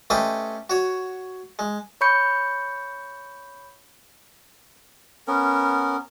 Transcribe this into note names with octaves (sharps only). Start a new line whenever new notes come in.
A3 C#4 G4 B4 C5 D#5
F#4 C#5
G#3
C#5 B5 C#6 G6 C#7
B3 C#4 A#4